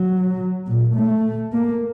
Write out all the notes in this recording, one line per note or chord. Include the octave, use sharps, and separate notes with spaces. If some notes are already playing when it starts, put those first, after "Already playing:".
Already playing: F#3
A#2
A3
A#3